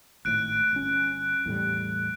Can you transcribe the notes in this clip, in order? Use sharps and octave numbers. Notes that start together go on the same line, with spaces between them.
G#1 A2 F#6 D7
G1 C#4
E2 A2 G3